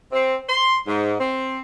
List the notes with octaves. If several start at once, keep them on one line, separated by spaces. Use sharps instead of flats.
C4
C6
G#2
C4